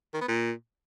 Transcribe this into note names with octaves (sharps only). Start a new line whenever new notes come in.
D#3
B3
A#2